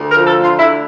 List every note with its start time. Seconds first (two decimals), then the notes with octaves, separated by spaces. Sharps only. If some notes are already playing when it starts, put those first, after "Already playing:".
Already playing: D2
0.10 A#4
0.15 F3
0.25 A4
0.36 D2
0.42 F4
0.58 D3 E4